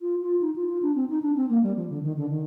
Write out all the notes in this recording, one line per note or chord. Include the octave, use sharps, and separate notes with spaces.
F4
F4
D#4
F4
F4
D4
C4
D#4
D4
C4
A#3
G3
F3
D3
D#3
D3
D#3